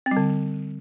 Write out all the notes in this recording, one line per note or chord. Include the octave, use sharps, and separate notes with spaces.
C4
G3
D3